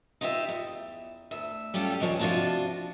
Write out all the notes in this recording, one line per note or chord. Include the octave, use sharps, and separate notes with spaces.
D#4 F4 G4 D5 E5
E2
D2 E5
G3 C#4 F4 G4 A4
D#2 D#3 F3 C#5 D5 G#5
C3 F3 D4 F4 F#4 A5